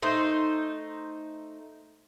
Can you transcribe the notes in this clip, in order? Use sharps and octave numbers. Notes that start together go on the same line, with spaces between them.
A3 D#4 C5